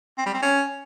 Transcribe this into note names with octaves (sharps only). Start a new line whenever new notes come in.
C4
G3
C4
C#4